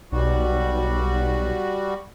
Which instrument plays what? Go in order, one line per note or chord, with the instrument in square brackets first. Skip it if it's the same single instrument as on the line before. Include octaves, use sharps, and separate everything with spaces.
[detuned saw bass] B1 [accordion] G3 F#4